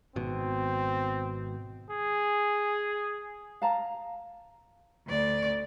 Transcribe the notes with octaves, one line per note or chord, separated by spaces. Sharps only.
G#1 B2 C4
G#4
F5 A5 A#5
D2 D5